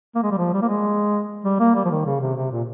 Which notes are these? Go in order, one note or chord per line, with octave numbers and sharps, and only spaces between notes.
A#3
G#3
G3
F3
G3
A#3
G#3
G3
A#3
G3
F3
D#3
C#3
C3
C3
A#2